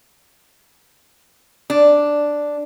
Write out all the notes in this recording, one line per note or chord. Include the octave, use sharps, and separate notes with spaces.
D4